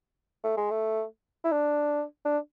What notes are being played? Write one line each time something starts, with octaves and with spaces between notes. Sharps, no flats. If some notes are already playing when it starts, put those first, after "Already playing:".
A3
G#3
A3
E4
D4
D4